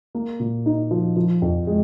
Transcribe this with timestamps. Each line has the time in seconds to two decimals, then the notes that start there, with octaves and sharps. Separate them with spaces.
0.15 A#3
0.40 A#2
0.66 D#4
0.91 F3
1.16 F3
1.42 F2
1.67 G#3